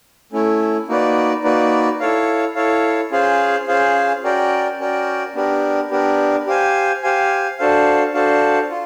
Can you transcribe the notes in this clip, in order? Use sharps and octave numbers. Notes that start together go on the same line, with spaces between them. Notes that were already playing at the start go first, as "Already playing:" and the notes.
A3 C#4 E4
A#3 D#4 F#4 B4 D5
A#3 D#4 F#4 B4 D5
E4 A4 C#5 F5
E4 A4 C#5 F5
C#4 F4 G#4 C5 F5
C#4 F4 G#4 C5 F5
C#4 F#4 A#4 D5 G5
C#4 F#4 A#4 D5 G5
B3 D4 G4 A#4
B3 D4 G4 A#4
G4 C5 F5 G#5
G4 C5 F5 G#5
D4 F#4 A4 C5 F5
D4 F#4 A4 C5 F5
F4